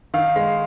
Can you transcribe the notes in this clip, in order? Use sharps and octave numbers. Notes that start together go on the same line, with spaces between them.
D#3 F5
G#3